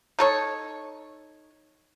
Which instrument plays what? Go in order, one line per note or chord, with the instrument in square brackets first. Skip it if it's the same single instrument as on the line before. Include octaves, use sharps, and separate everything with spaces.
[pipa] D#4 A4 C#5